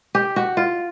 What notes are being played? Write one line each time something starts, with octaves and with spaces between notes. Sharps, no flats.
G4
F#4
F4